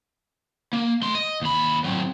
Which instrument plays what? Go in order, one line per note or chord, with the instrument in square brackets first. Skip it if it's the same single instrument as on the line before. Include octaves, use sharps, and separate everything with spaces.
[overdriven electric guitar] A#3
A3 C6
D#5
D#2 B5
F#3 C4